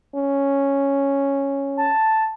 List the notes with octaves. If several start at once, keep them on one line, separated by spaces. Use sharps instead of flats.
C#4
A5